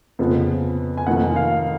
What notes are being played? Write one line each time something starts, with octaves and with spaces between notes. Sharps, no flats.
F2 C#3 F3 B3
G#5
F1 F2 D#3 F#5
F5